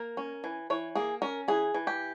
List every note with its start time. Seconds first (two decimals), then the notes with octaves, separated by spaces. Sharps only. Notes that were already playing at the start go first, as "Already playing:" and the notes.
Already playing: A#3 A#4
0.17 C#4
0.44 E3
0.70 E3 C#5
0.95 A#3 G#4
1.22 C#4 A#4
1.48 E3 G#4
1.74 E3
1.87 G4